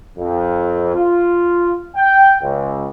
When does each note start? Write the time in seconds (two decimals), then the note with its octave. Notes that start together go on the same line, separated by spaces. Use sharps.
0.18 F2
0.95 F4
1.95 G5
2.42 C#2